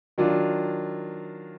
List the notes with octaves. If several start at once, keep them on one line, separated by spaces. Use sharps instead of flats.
D#3 F#3 D4 F4